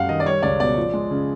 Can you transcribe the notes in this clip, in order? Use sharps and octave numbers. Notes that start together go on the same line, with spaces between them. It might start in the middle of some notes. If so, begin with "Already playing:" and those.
Already playing: F#2 G3 F5 F#5
D#3 D#5
D5
G3 C#5
C#2 D5
B2 D5
F3
G#3
C#3